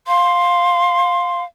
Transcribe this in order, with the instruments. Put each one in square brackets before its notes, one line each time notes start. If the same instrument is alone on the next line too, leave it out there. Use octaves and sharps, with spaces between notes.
[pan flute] F5 [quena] C6